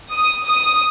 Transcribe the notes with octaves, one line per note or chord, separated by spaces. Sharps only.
D#6
D#6